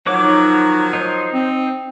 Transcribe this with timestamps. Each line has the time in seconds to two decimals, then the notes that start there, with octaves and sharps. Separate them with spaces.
0.06 D#3 F3 F#3 F#4 C#5 D6
0.23 D#4
0.93 D#4 C5
1.33 C4